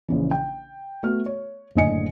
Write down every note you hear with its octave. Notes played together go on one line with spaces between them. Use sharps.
A#1 C#3 E3
G5
A3 B3 F#4 F6
C#5
F#1 A2 D3 D#5 G#5 C#7